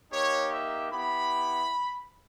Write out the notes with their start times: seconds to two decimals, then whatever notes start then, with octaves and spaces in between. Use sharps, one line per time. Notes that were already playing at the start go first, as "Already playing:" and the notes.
0.11 A#3 D#4 G4 C#5
0.51 E5
0.91 B3 E4 G4 B5